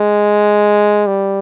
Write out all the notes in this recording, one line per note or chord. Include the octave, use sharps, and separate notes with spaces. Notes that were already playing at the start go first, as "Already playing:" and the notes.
Already playing: G#3
G3